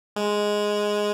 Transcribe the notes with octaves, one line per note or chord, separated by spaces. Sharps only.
G#3